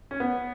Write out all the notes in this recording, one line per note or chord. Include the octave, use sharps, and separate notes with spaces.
C#4
B3